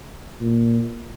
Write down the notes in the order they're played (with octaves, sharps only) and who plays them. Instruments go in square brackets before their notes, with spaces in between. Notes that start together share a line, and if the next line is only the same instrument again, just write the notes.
[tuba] A#2